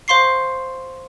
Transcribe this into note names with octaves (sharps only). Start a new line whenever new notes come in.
C5 F5 C6 C#6 C7